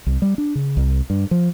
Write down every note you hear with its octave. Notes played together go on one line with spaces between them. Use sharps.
C2
G3
D4
C#3
C2
G2
F3